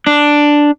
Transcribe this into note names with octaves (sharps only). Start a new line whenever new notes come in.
D4